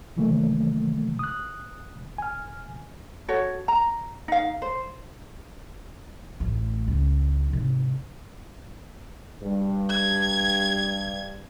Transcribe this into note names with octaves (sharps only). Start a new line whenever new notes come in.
C3 D#3 E3 F#3 A3 A#3
D#6 F#6
G#5 F6
F#4 A4 C#5
A#5
D#4 F5
C5
A1 A3
C#2
G#2 C3
G2
G#6